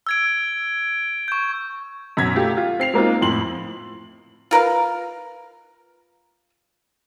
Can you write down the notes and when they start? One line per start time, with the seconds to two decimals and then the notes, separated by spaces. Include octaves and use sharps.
0.07 E6 G#6 D7
1.28 C#6 G6
2.17 F#2 B2 G#6 B6
2.35 A3 F4 G4
2.57 F4
2.79 C4 C7 F7
2.94 G#3 A#3 C4 D#4 F4
3.21 F2 A2 C6 F#7
4.51 F4 A#4 B4 F5